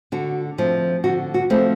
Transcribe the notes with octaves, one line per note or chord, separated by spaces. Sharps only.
D3 F#4
F3 A3 C4
D3 F#4
F#4
F3 A3 C4